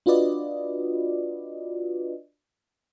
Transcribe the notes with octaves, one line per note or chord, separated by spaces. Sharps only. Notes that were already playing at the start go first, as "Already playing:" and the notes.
D4 F4 F#4 B4 D5 D#5